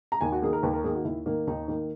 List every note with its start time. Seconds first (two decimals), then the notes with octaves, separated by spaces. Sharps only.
0.12 A#5
0.21 D#2 G#5
0.32 F#4
0.42 D#3 A#3 G#4
0.53 A#4
0.63 D#2 B4
0.74 A#4
0.84 D#3 A#3 G#4
0.95 F#4
1.05 D#2 E4
1.26 D#3 A#3
1.47 D#2 D#4
1.68 D#3 A#3